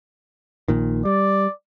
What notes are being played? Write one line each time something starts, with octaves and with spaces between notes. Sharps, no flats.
A#1 A#2 D#3
G3 D5